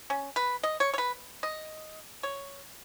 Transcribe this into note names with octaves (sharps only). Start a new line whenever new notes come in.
C#4
B4
D#5
C#5
C#5
B4
D#5
C#5